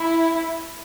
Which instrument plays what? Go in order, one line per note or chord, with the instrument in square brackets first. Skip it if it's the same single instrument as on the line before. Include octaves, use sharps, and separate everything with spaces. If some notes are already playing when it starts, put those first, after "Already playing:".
Already playing: [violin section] E4